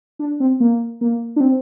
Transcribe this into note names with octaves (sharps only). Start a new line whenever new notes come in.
D4
C4
A#3
A#3
D4
C4